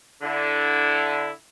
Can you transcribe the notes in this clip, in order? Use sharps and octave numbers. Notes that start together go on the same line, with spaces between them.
D3 E4